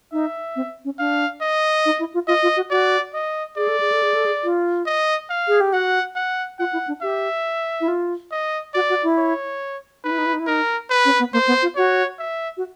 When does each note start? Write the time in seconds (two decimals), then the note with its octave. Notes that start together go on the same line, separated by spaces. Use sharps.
0.12 D#4 E5
0.56 C4
0.85 C#4
0.99 D4 F5
1.41 D#5
1.85 D#4
1.99 E4
2.14 F4
2.28 F4 D#5
2.43 F4
2.56 F#4
2.71 F#4 D5
3.14 D#5
3.57 G#4 D5
3.68 A4
3.80 G#4
3.92 A4
4.03 G#4
4.14 A4
4.26 G#4
4.44 F4
4.86 D#5
5.30 F5
5.48 G#4
5.61 G4
5.73 F#4 F#5
6.16 F#5
6.59 F4 F#5
6.73 E4
6.88 D4
7.02 G4 E5
7.81 E4
7.88 F4
8.32 D#5
8.74 F#4 D5
8.90 F#4
9.03 E4
9.17 C#5
10.04 D#4 B4
10.11 E4
10.18 D#4
10.26 E4
10.33 D#4
10.40 E4
10.47 D#4 A#4
10.90 B4
11.05 C#4
11.19 B3
11.33 A#3 C5
11.47 B3
11.62 F4
11.76 F#4 C#5
12.19 E5
12.57 F#4